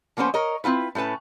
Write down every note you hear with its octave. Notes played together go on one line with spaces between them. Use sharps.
F3 A#3 B3 C#4 C5
A#4 C#5 D#5
C4 E4 F4 B4
A2 A3 C#4 B4 A5